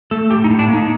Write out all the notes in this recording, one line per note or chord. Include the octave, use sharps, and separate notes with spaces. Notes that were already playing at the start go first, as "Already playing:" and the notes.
A3 A4
A2 G4
D#4
A2
D4
A#3
D#4